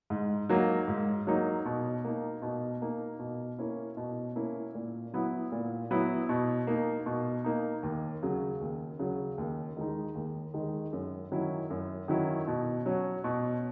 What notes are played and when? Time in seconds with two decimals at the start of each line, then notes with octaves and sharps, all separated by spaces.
0.10 G#2
0.49 F#3 A#3 D#4
0.88 G#2
1.27 F#3 A#3 D#4
1.66 B2
2.04 A#3 D#4
2.42 B2
2.82 A#3 D#4
3.19 B2
3.58 A#3 C#4 E4
3.97 B2
4.36 A#3 C#4 E4
4.75 A#2
5.14 F#3 B3 E4
5.52 A#2
5.91 F#3 B3 E4
6.29 B2
6.67 A#3 D#4
7.06 B2
7.45 A#3 D#4
7.83 D#2
8.23 C#3 F#3
8.61 D#2
8.99 C#3 F#3
9.38 D#2
9.77 D#3 G#3 D#4
10.15 D#2
10.54 D#3 G#3 D#4
10.93 F#2
11.32 D#3 F#3 C#4 E4
11.70 F#2
12.08 D#3 F#3 C#4 E4
12.47 B2
12.86 F#3 C#4
13.24 B2